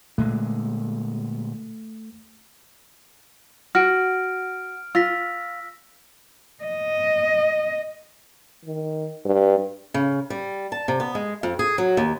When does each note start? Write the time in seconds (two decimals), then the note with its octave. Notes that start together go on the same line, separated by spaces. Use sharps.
0.18 A#2 D3 G#3 A3
3.75 F#4 F6 D7
4.95 F4 E6 A#6 B6
6.64 D#5
8.65 D#3
9.25 G2
9.94 C#3
10.30 G3
10.72 A5
10.88 C3
11.00 B3
11.15 G#3
11.43 F2
11.59 G#4
11.78 F#3
11.97 D#2